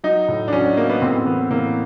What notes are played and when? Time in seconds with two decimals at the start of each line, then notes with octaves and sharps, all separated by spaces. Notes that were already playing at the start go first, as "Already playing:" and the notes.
0.04 F#3 D#4
0.28 A2
0.48 D4
0.52 F#3 C#4
0.77 F#3 A#3
0.90 B3
1.02 A2 C4
1.26 E3 B3
1.50 A2 A#3